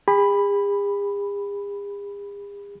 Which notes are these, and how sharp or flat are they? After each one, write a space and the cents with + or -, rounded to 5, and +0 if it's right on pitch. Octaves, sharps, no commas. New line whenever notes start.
G#4 -45 B5 +0